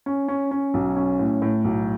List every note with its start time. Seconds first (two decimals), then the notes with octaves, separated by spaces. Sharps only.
0.06 C#4
0.28 C#4
0.51 C#4
0.74 B1
0.96 C#4
1.19 A2
1.42 A2
1.65 B1